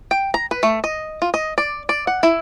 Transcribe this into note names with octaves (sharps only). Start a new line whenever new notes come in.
G5
A#5
B4
A3
D#5
F4
D#5
D5
D5
F#5
E4